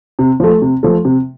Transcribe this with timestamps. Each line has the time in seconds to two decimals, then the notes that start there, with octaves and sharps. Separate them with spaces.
0.19 C3
0.40 F3 A3
0.62 C3
0.83 F3 A3
1.05 C3